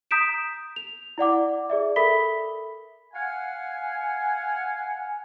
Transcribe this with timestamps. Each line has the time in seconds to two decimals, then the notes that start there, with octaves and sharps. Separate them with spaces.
0.11 A#5 D#6 G6 B6 D7 E7
0.76 F7
1.18 E4 D5 F#5 D6
1.70 G#4 D5 E5
1.96 A4 A#4 E5 B5 B6 G7
3.14 F5 F#5 G#5